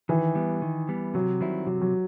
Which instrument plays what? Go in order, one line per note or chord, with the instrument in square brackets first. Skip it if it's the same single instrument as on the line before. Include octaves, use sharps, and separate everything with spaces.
[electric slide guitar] D#3 [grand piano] E3
[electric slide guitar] G3 B3
D#3
G3 B3
[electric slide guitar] C3 [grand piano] F#3
[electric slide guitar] D#3 G3 C4 E4
[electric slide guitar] C3 [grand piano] F#3
[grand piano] F#3